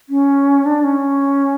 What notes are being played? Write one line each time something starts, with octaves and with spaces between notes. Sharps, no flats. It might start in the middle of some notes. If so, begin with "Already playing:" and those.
C#4
D4
C#4